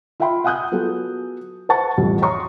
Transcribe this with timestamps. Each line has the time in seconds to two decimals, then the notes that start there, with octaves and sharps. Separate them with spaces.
0.20 F4 E5 F5 G5 B5 C6
0.44 F5 F#5 G#5 D#6 F#6 G6
0.72 F#3 B3 F4 G#4 A4
1.69 B4 C5 F#5 A5 C#6 A6
1.98 A1 F2 B2 G3
2.22 C#5 A#5 C6 C#6 D#6